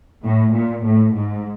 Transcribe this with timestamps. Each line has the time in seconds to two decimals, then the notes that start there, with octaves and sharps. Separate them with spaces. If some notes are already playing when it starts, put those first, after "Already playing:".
0.24 A2
0.55 A#2
0.85 A2
1.15 G#2